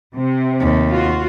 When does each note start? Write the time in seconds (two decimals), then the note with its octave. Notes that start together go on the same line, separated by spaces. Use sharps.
0.16 C3
0.60 D#2 A3
0.90 F4 F#4